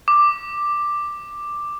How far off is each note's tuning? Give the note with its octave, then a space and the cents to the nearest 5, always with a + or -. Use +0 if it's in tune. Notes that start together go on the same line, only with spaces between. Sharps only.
D6 +5